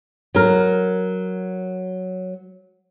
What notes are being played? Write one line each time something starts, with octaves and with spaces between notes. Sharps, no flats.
F#3 A#4